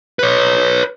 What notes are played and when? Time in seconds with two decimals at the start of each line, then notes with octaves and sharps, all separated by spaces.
0.19 B4 C#5